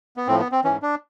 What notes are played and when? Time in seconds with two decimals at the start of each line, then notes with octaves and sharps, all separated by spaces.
0.17 B3
0.27 A2 F3 C4
0.39 B3
0.52 C4
0.64 G#2 E3 C#4
0.82 D4